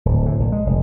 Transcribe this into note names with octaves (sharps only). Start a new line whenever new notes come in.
D1
A2
A#1
G#3
F1